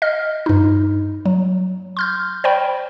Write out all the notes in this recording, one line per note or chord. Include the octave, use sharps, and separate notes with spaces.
D#5 F6
G2 D#4
F#3
C6 F6 G6
C5 D5 G5 B5